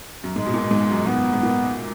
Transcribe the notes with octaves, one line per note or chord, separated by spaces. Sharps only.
F#2
G#2 G#3
B2
A#2
G#2
F#2
G#2 B3
G#2
A#2